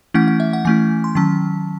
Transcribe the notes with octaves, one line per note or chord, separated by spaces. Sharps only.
E3 A3 C#4 E4 F#5
F#5
E5
F#5
E3 A3 C#4 E4 G#5
C6
D#3 F#3 C#4 A5